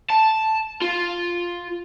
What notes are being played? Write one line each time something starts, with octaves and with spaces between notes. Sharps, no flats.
A5
F4